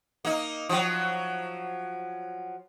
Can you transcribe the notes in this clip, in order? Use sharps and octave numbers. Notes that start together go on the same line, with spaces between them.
A#3 D#4
F3 F#3